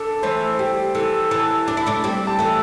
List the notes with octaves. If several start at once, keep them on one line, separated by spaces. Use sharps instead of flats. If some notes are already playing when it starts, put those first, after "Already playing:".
Already playing: D4 A4
E3 A3 C5
G3 G4
E3 A4
E3 A5
D4 A5
E4
A3 D4
G3 C4
A5
E3 A3